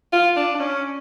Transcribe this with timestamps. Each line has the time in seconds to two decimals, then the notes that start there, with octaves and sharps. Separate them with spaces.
0.13 F4
0.36 D4
0.55 D4
0.60 C#4